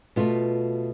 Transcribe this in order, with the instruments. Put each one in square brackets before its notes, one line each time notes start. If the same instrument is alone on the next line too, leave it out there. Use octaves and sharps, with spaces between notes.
[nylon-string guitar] B2 A3 F4